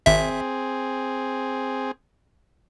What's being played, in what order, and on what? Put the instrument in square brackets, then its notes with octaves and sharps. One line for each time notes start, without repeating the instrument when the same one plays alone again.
[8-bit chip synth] G#1 E5 [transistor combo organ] C4 G#4